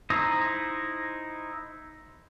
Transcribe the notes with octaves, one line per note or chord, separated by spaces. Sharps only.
D#4 E4 C5 A#5 D#6